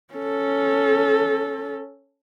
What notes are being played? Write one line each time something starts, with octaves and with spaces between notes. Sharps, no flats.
C#4 A4